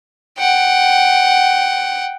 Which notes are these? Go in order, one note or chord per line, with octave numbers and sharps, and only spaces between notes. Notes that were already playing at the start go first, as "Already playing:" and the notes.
F#5 G5